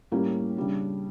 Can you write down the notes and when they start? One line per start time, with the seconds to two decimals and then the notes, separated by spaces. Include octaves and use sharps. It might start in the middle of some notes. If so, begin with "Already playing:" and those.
0.12 A2 G3 A#3 C#4 G4
0.57 C#3 G3 D4